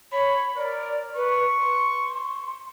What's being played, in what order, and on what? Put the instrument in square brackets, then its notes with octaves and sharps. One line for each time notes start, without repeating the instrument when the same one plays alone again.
[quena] C#5 [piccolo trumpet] B5
[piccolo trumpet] A#4 [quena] D5
[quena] B4 [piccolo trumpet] C#6
[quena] C6